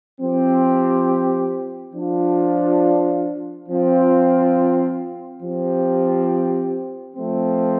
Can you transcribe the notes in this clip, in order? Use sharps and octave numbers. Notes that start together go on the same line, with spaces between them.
F3 C4 G4
F3 D4 F4
F3 C4 F4
F3 C4 G4
F3 A3 C4